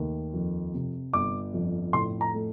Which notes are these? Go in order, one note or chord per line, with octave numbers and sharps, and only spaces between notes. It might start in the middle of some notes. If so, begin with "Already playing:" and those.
Already playing: D#2 A3
F2
C3
G1 D6
F2
A2 C6
A#5
A3